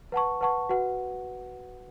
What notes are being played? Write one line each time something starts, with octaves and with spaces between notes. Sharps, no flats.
B4 F#5 A5 C#6
B4 F#5 A5 C#6
F#4 B4 F#5